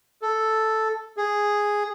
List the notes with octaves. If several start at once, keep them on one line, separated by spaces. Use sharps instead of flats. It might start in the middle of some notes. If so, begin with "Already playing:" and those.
A4
G#4